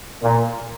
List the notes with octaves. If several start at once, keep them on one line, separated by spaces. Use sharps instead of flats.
A#2